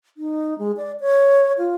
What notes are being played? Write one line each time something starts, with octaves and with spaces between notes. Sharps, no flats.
D#4
G#3
D5
C#5
F4